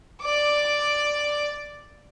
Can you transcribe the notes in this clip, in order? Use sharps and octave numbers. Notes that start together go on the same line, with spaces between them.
D5 D6